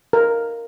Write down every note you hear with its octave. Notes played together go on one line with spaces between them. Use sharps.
A#4